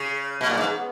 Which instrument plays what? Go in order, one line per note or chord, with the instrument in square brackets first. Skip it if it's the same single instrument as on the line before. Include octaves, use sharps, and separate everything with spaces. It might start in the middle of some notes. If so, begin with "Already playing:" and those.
Already playing: [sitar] C#3
[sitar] B2 [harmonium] A#3
[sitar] A#2
[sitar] G#2 [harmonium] B3
[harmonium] B3